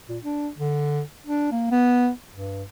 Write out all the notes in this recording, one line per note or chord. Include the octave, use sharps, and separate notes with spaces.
A#2
D4
D3
D4
A#3
B3
G2